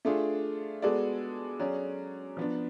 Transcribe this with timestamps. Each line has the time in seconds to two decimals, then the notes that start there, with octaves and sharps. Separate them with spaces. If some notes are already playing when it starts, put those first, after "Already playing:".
0.05 A3 D4 F4 G#4
0.82 G#3 B3 F#4 A4 D5
1.59 F#3 C#4 G#4 D5
2.37 F3 B3 D4